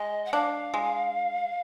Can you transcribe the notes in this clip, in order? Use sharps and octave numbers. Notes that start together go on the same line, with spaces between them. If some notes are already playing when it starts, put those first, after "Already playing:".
Already playing: G#3 D#5
F#5
D4 F5
G#3